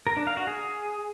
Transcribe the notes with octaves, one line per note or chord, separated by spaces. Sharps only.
A#4
D4
F5
F#4
G#4